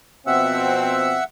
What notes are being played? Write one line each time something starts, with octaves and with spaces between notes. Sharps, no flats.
B2 F3 C4 E5 F#5 E6